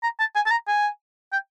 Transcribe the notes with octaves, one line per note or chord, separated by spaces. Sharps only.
A#5
A5
G#5
A5
A#5
G#5
G5